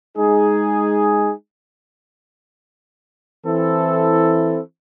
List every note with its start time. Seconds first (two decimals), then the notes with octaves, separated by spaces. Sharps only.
0.17 G#3 D#4 G#4
3.45 E3 C4 E4 A4